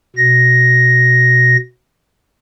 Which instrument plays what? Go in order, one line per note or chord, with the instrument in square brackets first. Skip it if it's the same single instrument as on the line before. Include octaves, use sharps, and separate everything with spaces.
[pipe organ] B2 A#6